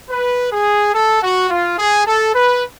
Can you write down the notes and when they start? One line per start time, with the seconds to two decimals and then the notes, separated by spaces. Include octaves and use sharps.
0.10 B4
0.52 G#4
0.94 A4
1.22 F#4
1.50 F4
1.79 G#4
2.06 A4
2.34 B4